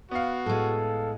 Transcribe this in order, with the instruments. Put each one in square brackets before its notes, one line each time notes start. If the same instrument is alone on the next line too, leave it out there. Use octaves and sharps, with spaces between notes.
[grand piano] B3 F5 [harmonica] F#4
[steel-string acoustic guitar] A2 G#3 [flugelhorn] A4